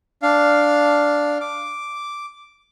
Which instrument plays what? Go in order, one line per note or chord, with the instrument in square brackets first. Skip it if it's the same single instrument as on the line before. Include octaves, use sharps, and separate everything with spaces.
[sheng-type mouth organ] D4 F5
D6